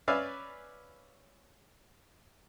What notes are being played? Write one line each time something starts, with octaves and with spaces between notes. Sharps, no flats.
C#4 B4 D5 E5 F5 G#5